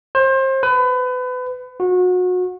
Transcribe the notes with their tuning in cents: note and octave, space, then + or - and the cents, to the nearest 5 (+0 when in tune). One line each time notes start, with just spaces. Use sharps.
C5 +30
B4 +30
F#4 -30